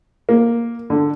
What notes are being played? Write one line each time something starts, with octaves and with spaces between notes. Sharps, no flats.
A#3
D3